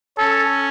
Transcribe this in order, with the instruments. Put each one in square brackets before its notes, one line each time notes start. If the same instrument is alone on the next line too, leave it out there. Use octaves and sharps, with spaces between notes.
[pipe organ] C#4 [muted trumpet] A4